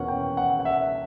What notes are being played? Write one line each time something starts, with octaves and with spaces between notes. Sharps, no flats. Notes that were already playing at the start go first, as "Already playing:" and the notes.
Already playing: E2 B2 A#3 C#4 F#5
G5
F#5
F#5
E5